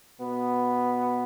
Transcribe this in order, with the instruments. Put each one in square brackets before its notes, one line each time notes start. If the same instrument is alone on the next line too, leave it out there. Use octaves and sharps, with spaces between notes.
[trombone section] B2 B3